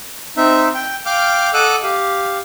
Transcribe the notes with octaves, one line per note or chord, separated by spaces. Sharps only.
C4 D#4 E5
G5
F5 G5 D6 F6
A4 D#5 F#5 D6 E6 F#6
G4 F5